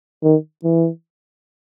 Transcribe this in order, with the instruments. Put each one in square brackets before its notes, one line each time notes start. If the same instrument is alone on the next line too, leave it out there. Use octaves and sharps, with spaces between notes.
[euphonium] D#3
E3